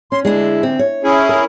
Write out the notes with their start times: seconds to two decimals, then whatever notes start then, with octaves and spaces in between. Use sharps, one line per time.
0.12 C#4 C6
0.25 D2 G#3 D4 E4
0.63 C4
0.79 C#5
1.04 C#4 E4 G#4
1.29 A#4